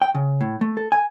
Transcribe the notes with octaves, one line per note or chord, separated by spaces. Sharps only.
G5
C#3
A2
A3
A4
G#5